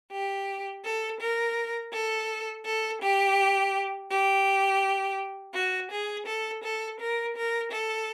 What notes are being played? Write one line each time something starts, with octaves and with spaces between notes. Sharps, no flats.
G4
A4
A#4
A4
A4
G4
G4
F#4
G#4
A4
A4
A#4
A#4
A4